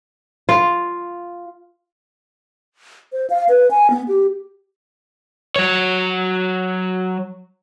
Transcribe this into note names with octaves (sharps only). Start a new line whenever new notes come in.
F4
C5
F5
B4
G#5
B3
G4
F#3 C#5